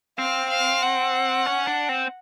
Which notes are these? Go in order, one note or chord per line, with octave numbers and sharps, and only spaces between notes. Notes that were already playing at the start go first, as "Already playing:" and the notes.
C4 F5
F5
F#5
C#4
D4
C4